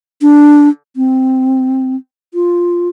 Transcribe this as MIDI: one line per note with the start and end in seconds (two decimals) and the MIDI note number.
0.22 0.69 62
0.96 1.96 60
2.34 2.89 65